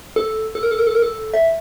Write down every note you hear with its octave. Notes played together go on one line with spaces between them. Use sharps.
A4
A4
A#4
A4
A#4
A4
A#4
A4
E5